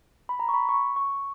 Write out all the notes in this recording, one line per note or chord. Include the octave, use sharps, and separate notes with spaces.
B5
A#5
C#6
B5
C#6
C#6